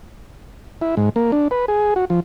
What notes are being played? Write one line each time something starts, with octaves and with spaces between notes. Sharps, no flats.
E4
G#2
A#3
D4
B4
G#4
F#4
F3